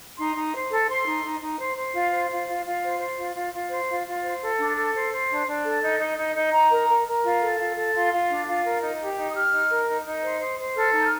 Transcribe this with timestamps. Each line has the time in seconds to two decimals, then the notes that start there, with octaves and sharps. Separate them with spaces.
0.18 D#4 C6
0.36 D#4
0.54 C5
0.71 A4
0.89 C5 C6
1.07 D#4
1.25 D#4
1.42 D#4
1.59 C5
1.76 C5
1.95 F4
2.12 C5
2.30 F4
2.48 F4
2.65 F4
2.83 C5
3.00 C5
3.17 F4
3.35 F4
3.53 F4
3.70 C5
3.88 F4
4.07 F4
4.23 C5
4.41 A4
4.59 D4
4.77 A4
4.95 C5
5.11 C5
5.30 D4
5.47 D4
5.65 A4
5.83 D#4
6.00 D#4
6.18 D#4
6.34 D#4
6.52 D#4 A#5
6.70 A#4
6.88 A#4
7.06 A#4
7.24 F4
7.41 A4
7.59 F4
7.76 A4
7.94 F4 C6
8.12 F4
8.29 D4
8.46 F4
8.64 A#4
8.81 D#4
9.00 G4
9.17 D#4
9.29 D#6
9.34 G4 F6
9.53 D#4
9.70 A#4
9.88 D#4
10.05 D#4
10.22 C5
10.41 C5
10.58 C5
10.75 A4 F6
10.93 D#4 G6
11.04 F6